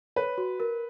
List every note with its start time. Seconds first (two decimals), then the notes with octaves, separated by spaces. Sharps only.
0.16 B4 C#5
0.38 F#4
0.60 A#4